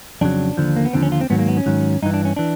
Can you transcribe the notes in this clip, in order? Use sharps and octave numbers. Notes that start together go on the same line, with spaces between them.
F2 C#3 F#3 D4
D#2 D3 F3
A#3
B3
D#2 D3 F3 C4
C#4
F4
C4
G#2 D#3 F#3 B3
A#3
B3
C#4
G#2 D#3 F#3
G2 E3 D#4
D4
C#4
E3 D4